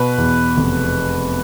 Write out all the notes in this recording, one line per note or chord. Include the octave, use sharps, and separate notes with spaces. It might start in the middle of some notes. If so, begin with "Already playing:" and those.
Already playing: B2 B4
E2
F1